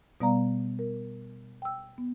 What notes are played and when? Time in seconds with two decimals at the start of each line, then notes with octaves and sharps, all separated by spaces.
0.21 B2 G3 B3 D5 F5 A#5
0.79 A#4
1.62 G5 E6
1.98 B3